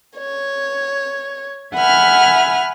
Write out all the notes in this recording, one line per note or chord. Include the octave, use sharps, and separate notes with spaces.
C#5
E5 F#5 G#5 B5 F6